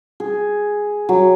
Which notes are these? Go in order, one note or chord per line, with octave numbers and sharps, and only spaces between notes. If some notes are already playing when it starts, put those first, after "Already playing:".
G#4
F#3